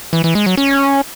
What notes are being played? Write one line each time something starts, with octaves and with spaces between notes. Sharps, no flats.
E3
E3
G#3
F#3
C#4